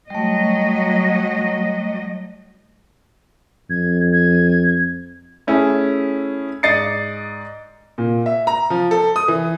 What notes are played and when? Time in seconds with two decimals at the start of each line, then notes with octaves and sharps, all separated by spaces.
0.10 F#3 G3 A3 D#5
3.70 F2 G#6
4.13 G#6
5.47 A3 C#4 E4 G#4
6.63 G#2 D5 D#5 A6 C7 C#7
7.98 A#2
8.26 E5
8.47 A#5
8.70 F3
8.91 A4
9.16 D#6
9.28 E3